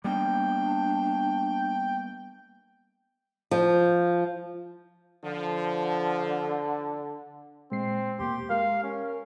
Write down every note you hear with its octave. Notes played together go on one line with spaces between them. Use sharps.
G3 A#3 B3 D4 G5
F3
D3 F3
A#2 G#3 C4 C7
E2 B2 A#3 G4 C6
G#3 G4 A#4 F5
C#4